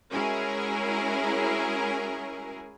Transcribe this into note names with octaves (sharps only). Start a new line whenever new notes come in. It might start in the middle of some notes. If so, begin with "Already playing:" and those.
G#3 C#4 E4 F#4 G#4 A#4